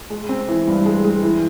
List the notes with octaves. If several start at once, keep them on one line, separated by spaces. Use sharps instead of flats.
G#3
C4
E3
G2
G#3
G#3
E3